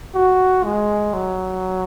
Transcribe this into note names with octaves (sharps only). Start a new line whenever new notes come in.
F#4
G#3
F#3